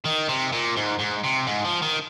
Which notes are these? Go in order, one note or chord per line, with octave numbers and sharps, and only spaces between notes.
D#3
C3
A#2
G#2
G#2
C3
G#2
F3
D#3